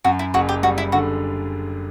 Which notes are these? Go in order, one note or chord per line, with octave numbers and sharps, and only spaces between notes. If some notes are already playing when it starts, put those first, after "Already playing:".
F#2 F#4
E4
F#1 F#4
G4
G3 F#4
E4
D3 F#4